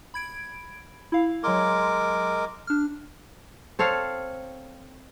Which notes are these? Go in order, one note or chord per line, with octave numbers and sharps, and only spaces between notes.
B5 G#6 D7
E4 F5
F#3 G#3 A#4 C6 D6
D4 F6
C4 A4 C#5 F5